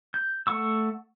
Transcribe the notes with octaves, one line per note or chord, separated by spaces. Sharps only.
G6
A3 F#5 C#6 E6